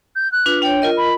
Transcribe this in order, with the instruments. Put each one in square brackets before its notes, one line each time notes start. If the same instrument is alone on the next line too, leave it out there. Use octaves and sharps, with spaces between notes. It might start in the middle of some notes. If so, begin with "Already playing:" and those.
[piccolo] G6
F#6
[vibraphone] D4 F4 B4
[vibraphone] D4 C#5 [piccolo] G5
[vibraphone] F4 A#4 D#5
[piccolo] B5